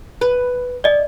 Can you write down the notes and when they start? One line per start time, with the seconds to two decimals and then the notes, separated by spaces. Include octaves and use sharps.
0.21 B4
0.84 D5 D#5